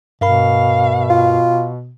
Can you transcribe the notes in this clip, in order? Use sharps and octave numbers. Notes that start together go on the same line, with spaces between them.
G2 B2 A#4 F5 B5
F4